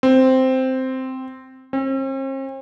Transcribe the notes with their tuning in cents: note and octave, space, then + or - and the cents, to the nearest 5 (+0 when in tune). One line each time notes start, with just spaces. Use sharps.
C4 -5
C4 +45